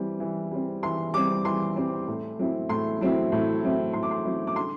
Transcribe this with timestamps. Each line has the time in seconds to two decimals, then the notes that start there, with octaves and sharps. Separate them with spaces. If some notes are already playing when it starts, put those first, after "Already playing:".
Already playing: E3 G3 C4
0.20 E3
0.51 G3 C4
0.83 E3 C6
1.14 G3 C4 D6
1.45 E3 C6
1.76 G3 C4
2.08 A2
2.39 F#3 C4 E4
2.69 A2 C6
3.01 F#3 C4 E4
3.32 A2
3.63 F#3 C4 E4
3.93 A2 C6
4.03 D6
4.11 C6
4.25 F#3 C4 E4
4.47 D6
4.56 D3 C6